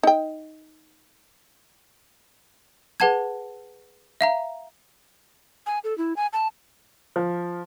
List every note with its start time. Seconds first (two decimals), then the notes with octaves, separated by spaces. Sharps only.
0.03 D#4 G5
3.00 G#4 B4 F#5 A5 G#6
4.21 E5 F5 A#5
5.66 G#5
5.84 A4
5.98 E4
6.17 G#5
6.33 A5
7.16 F3